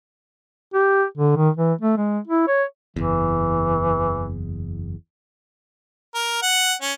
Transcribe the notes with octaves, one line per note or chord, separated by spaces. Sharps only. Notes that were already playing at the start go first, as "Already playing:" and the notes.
G4
D3
D#3
E3
A3
G#3
E4
C#5
F#1 E2 E3
A#4
F#5
C#4